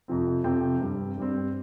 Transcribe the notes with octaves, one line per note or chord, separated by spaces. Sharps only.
F2 C3 F3 C4
F2 C3 F3 C4 G5
G2 G3 C4
G2 G3 C4